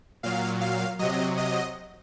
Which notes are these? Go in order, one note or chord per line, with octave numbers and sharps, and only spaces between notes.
A#2 F#3 F5
F5
C3 F#3 D#5
D#5